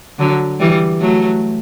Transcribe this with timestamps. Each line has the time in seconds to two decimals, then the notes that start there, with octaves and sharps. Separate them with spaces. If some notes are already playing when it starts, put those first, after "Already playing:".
0.19 D3 F#3
0.60 E3 G3
1.00 F#3 A3